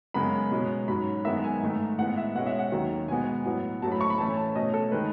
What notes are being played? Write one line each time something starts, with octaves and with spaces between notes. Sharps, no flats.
F#2 C#3 G#3 B3 B5
B2 G#3 C#4
G#2 F#3 C#4 B5
F#2 D#3 G#3 B3 E5
G#5
G#2 D#3 A3
A2 G#3 B3 F#5
E5
B2 G#3 C#4 F#5
E5
F#5
D#2 D#3 F#3 C#4
B2 G#3 B3 G#5
A2 F#3 B3
A2 F#3 A3 C#4 A5
B5
C#6
B5
A2 E3 A3 C#4 A5
A5
B2 A3 C#4 D#5
A4
D#3 G#3 B4